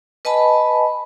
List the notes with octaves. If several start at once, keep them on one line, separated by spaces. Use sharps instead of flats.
B4 D#5 G#5 A5 B5